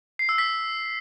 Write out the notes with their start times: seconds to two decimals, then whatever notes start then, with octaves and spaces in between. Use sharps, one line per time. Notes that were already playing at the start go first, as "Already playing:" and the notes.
0.19 C7
0.29 E6
0.38 B6